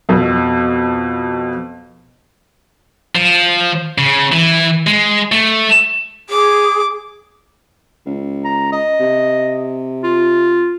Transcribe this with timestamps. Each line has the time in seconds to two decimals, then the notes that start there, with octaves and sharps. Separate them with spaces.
0.09 F2 B2
3.15 F3
3.98 C#3
4.32 E3
4.87 G#3
5.32 A3
6.30 G#4 D6
8.06 C#2
8.45 A#5
8.73 D#5
9.00 C3
10.04 F4